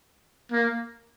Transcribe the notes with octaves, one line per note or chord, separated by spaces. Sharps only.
A#3